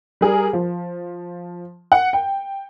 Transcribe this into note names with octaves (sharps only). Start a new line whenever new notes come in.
G3 G#4 A#4
F3
F#5
G5